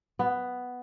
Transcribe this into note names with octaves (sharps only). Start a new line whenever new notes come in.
B3